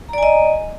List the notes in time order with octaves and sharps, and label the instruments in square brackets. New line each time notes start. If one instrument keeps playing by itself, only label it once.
[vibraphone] A#5
D5
G#5
D#5